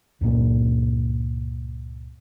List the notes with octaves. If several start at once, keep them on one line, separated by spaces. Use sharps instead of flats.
C#2 G2 A#2 A#3